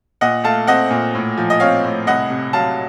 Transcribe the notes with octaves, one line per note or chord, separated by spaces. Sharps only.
A#2 D#5 F#5
A3 F5 A5
C4 D#5 F#5
A#2
A2
F3
D#5
C4 C#5 F5
A2
C2 D#5 F#5
C3
F#3 F5 A5